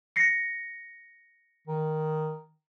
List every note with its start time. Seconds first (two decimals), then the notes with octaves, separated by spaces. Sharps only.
0.16 A#6 C7 C#7
1.67 D#3